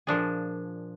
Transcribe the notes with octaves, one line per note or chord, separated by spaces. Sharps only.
A#2 F3 D4 G#4